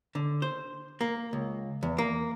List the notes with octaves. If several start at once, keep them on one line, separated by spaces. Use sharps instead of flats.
D3
C5
A#3
C#2
E2
A#3